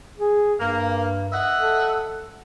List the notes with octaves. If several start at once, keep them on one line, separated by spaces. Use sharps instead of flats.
G#4
G2 A#3
D#5 E5 F#5
A4